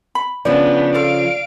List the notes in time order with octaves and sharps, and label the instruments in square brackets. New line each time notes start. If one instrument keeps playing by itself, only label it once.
[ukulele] B5
[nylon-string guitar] C#3 F3 [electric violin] B3 D4 [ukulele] C5 [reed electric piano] D5
[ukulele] F4 A4 [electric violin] F5 D7